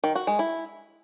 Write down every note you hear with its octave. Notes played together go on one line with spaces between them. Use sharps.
D#3
F#4
G#3
E4